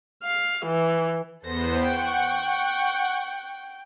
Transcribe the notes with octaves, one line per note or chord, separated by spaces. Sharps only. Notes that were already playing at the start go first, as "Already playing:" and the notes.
F5
E3
E2 B3 A4 C5 A#6
F#5 G5 C#6